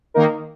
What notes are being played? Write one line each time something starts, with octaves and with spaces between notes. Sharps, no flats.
D#3 A#3 D#4 A#4